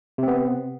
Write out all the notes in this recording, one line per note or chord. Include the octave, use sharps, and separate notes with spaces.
C3 B3 C4